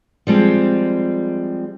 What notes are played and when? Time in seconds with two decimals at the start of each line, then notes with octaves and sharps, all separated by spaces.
0.27 F3 G3 G#3 C4